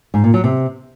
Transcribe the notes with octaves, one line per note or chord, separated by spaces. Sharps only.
G#2
A#2
F#3
C3